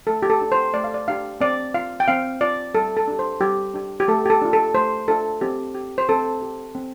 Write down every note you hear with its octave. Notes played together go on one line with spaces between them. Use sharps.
A3 A4
G4
A4
D4 G4
C5
A3 D5
F5
D5
D4 G4 F5
C4 D5
F4 F5
G5
C4 F5
F4 D5
G3 A4
A4
D4 G4
C5
G3 G4
D4 G4
G4
A3 A4
G4
A4
D4 F4
A4
A3 C5
D4 F4 A4
C4 G4
G4
C5
C4 A4
G4
C4